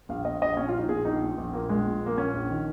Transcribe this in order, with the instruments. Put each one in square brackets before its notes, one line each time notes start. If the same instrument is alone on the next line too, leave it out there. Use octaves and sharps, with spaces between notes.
[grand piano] A#1 F5
A#2 D#5
A#1 D#5
A#2 C#4
F4
A#1 D#4
A#2 G#4
A#1 D#4
A#2
A#1
A#2 A#3
A#1 G#3
A#2
A#1
A#3
A#2 C#4
A#1
D#3